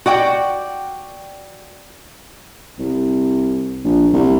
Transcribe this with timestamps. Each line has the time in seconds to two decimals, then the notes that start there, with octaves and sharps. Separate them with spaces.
0.06 F#4 D5 G5
2.79 C2
3.84 A#1
4.14 C2